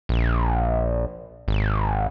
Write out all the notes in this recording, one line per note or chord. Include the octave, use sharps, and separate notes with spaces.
A#1
G#1